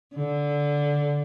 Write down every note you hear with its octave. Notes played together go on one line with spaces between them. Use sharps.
D3